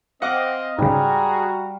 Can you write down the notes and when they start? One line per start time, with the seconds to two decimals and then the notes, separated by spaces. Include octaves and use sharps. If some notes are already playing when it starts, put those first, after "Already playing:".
0.22 C4 D#5 F5 F#5 D6
0.79 G#2 C#3 G3 F#4 G#4 A#5